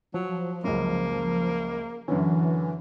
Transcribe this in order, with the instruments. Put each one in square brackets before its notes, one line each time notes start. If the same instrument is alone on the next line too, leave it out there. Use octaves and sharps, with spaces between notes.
[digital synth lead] F3 [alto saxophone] F#3
[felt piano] C#2 F#2 [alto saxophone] A#3
[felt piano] F#2 D3 C#4 [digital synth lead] E3